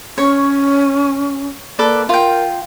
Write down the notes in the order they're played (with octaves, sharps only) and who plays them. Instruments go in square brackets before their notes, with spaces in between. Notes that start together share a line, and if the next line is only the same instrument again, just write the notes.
[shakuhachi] C#4 [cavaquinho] C#5
[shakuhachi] A#3 [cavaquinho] A4 B4 D5
[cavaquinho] F4 G5 [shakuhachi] A#4